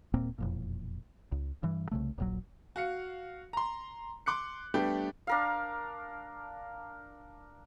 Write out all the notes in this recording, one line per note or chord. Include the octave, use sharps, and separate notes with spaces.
D#1 A#2 A#3 C4
E1 F2 A#2
C#2
G2 E3
C2 C#3 A3
D#1 A#1 F#3
F#4 F5 C#7
A#5 C6
C6 D6 F#6 C#7
G3 A3 B3 D4 G4
D4 A#4 F5